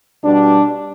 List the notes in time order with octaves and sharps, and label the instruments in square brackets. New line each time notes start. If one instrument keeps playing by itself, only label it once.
[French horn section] B2 G3 D4